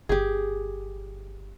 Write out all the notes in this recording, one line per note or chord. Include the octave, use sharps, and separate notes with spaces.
G1 G4 G#4